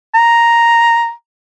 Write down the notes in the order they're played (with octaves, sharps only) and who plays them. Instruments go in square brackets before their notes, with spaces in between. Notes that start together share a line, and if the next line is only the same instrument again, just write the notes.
[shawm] A#5